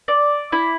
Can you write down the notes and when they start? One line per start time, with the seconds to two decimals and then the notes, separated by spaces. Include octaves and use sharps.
0.08 D5
0.52 E4